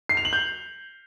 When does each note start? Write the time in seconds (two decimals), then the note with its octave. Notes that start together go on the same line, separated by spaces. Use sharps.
0.09 C7
0.17 F7
0.25 F#7
0.33 G6